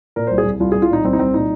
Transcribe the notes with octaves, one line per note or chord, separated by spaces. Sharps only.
A#2 A#4
C2 C5
G#4
C2
C2 F4
C2 G#4
F4
A#2 D#4
C2 C4
D#4
C2 C4
A#2 D#4